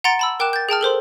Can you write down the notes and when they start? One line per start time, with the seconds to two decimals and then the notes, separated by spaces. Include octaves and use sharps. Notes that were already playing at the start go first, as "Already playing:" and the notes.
0.04 F#5 A#5 C6 A6 D7
0.19 A5 B5 E6
0.40 A#4 G5 D6 F#6 E7
0.53 G6 A6
0.69 G#4 G5 A5 F6
0.81 A4 A#4 C5 C6